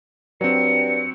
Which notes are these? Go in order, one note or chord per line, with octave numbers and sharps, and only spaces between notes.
G2 F#3 C4 C#7